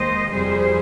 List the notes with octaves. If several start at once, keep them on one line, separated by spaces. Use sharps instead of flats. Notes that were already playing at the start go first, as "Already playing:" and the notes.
Already playing: D#2 D#3 G#3 C5 D#5
F2 C3 G3 G#4 C5